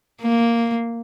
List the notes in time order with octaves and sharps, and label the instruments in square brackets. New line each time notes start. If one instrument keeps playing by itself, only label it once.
[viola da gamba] A#3